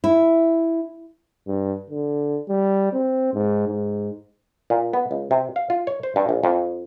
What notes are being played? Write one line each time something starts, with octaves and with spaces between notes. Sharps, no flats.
E4
G2
D3
G3
C4
G#2
G#2
A#2
B3
C#2
C3
F5
F4
C#5
C5
G2
A#1
F2